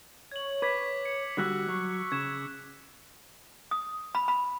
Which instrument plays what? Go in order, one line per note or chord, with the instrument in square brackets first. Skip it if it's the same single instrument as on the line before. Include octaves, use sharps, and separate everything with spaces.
[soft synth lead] C#5 [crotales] G#6 F#7
[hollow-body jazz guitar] B4 [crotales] D6 G#6 B6
[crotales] C#7
[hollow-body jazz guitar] D3 G3 F#4 [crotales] E6 F#6 B6
[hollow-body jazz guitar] F#3 [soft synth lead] C#6
[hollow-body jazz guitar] C#3 [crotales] G#6 E7
[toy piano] D#6
B5
B5